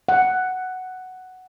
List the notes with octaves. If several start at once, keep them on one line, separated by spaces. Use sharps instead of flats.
F#5